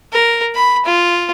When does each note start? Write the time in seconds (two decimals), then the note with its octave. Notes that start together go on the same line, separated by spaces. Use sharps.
0.13 A#4
0.55 B5
0.85 F4